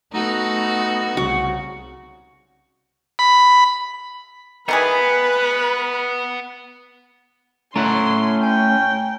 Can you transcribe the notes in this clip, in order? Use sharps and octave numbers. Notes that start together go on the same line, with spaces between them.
A3 B3 D#4 F#4
C2 C#3 F#4
B5
D#3 E3 B3 G#4 B4
A3 C#4 E4 F#5 A#5 C6
G5 G#5